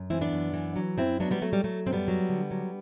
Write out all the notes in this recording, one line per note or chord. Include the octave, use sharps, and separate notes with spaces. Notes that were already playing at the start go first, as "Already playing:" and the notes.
Already playing: F#2
E3 C4 E4
B3 D4
F#2
E3
F#3
F#2 C4 E4
F#3 B3 D4
G3 B3
F#3 A3
G3
F#3 A3
F#2 C4
G3 B3
F#3
D3
F#3